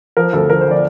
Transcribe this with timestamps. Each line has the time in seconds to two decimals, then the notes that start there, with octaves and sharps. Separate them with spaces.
0.17 F3 A#4
0.33 D2 A4
0.50 F3 A#4
0.61 C5
0.66 F3 D5